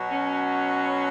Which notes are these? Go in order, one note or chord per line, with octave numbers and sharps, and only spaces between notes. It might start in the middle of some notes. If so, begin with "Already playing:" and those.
Already playing: B2 F#3
C#4